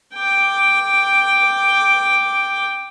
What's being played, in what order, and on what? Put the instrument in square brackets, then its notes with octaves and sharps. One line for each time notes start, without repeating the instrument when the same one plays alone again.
[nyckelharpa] G5 D6